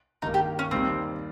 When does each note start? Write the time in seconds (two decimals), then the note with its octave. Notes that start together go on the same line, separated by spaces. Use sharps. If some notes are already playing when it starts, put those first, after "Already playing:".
0.22 G2 D#3 A#3 D#4
0.34 G4
0.59 C#4
0.71 D#2 D#3 G3 C4